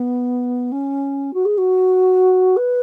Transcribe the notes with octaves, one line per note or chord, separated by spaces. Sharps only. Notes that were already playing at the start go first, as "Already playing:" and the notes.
Already playing: B3
C#4
F#4
G#4
F#4
B4